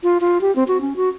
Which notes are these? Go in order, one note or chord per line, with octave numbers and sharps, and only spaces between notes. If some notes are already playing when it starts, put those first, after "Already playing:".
F4
F4
G4
C4
F#4
C#4
F#4